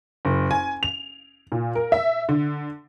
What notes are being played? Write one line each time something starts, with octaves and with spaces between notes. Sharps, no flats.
F#1
G#5
F7
A#2
A#4
E5
D3